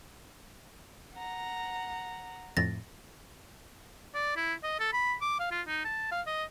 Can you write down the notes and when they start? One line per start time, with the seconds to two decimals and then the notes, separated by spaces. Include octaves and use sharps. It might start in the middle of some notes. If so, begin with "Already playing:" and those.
1.14 F#5 A#5
2.57 F2 A2 A6 A#6
4.14 D5
4.36 E4
4.63 D#5
4.80 A4
4.93 B5
5.21 D6
5.39 F5
5.51 F4
5.67 D#4
5.84 A5
6.11 F5
6.26 D#5